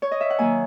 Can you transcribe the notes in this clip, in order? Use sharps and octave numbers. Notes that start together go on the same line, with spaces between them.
C#5
D#5
E5
F#5
D#3 F#3 A#3 G#5